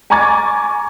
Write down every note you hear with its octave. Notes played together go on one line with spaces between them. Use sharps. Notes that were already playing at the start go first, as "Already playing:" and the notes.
G#5 A#5 C#6 D6 G#6 A6